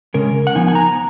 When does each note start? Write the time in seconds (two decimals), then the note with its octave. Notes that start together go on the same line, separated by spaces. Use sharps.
0.14 C#3 G#3 C#4 A#4
0.47 F#5
0.55 F3 B3 D#4 G#5
0.68 G#5
0.75 A#5